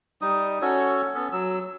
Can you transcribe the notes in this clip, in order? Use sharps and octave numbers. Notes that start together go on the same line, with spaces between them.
G3 D#4 D#6
C#4 F#4 A4 C#5
B3 C#4 A4
F#3 E6